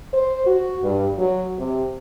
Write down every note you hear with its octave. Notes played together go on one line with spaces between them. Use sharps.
C5
F#4
G2
F#3
C3